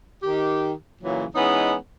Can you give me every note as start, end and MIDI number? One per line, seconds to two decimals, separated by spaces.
0.23 0.72 51
0.23 0.72 67
1.02 1.25 46
1.02 1.25 49
1.02 1.25 52
1.02 1.25 54
1.35 1.74 52
1.35 1.74 56
1.35 1.74 59
1.35 1.74 61
1.35 1.74 63